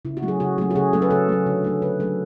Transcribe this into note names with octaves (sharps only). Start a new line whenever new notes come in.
C#3 E4
F#4
F#3 A3
G#4
C#3 F#4
F#3 A3 F#4
F#4
C#3 G#4
F#3 A3 A4
B4
C#3 A4
F#3 A3
D3
F#3 A3
D3 B4
F#3 A3 A4